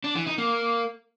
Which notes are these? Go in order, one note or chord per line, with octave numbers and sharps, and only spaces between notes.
D4
E3
D#4
A#3